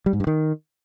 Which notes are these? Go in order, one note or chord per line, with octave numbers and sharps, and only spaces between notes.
G3
G#2
G2
D#3